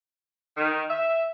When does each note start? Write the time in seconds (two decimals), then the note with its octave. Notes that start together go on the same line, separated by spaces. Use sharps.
0.57 D#3
0.89 E5